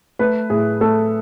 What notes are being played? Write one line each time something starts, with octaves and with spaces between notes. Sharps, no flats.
A3 B4
A2 G#4
A3 A4